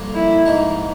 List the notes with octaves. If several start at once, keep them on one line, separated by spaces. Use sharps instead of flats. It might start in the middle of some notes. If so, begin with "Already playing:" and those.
Already playing: G2 D3 F3 A#3
E4
G#2 F3 A#3 D#4